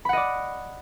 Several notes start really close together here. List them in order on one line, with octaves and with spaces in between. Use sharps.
B5 F#5 D#5 D5